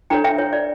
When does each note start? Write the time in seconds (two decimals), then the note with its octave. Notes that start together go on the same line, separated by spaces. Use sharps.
0.10 D4 A4 C#5 G5 A#5
0.24 E5 G5
0.38 C#5
0.53 D5